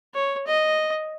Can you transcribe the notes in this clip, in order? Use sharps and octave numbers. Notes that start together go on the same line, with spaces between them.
C#5
D#5